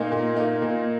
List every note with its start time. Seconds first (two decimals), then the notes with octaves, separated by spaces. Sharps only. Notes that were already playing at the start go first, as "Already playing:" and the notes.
Already playing: A#2 A#3 D#4
0.12 A#2
0.36 A#3 D#4
0.62 A#2